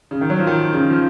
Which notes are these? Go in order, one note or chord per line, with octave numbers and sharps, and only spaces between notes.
C#3
D#3
F#3
F3
D#3
C#3
F3